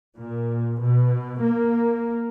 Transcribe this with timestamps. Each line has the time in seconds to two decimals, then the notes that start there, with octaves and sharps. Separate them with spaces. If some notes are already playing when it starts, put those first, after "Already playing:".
0.17 A#2
0.81 B2
1.42 A#3